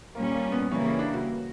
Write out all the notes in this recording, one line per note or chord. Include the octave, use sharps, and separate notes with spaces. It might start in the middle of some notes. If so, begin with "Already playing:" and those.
A#2 G3 A#3 C#4
A#3
B3
C#3 E3 G3 A#3 C#4
C#4
D4
F#4